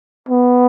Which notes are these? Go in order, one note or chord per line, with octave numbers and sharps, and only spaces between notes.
B3